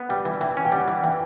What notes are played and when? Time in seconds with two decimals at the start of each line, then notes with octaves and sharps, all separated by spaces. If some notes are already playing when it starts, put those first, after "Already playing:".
Already playing: B3
0.09 G3 G5
0.25 E3
0.41 E3 G5
0.57 C#4
0.65 G5
0.72 G3 F#5
0.88 E3
1.03 E3 G5